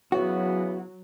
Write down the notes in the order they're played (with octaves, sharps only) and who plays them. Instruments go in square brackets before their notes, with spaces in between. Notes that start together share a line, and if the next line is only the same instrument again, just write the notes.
[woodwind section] C#3 E3 B3 [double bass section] F#3 [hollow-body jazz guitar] F#4